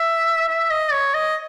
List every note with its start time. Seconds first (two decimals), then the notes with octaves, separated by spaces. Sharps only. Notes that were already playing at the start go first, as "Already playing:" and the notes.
Already playing: E5
0.49 E5
0.71 D#5
0.93 C#5
1.14 D#5